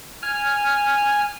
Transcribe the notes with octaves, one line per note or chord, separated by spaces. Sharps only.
G#5 F6